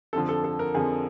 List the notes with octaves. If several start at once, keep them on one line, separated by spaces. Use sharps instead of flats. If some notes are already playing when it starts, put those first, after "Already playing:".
F2 D3 F3 A4
A4
A4
A#4
F2 D3 F3 G#4